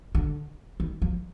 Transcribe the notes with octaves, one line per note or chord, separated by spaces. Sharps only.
D3
D#3
F3